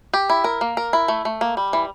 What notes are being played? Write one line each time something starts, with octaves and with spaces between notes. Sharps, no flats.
G4
E4
A#4
A#3
A#4
E4
A3
A3
A#3
G3
E3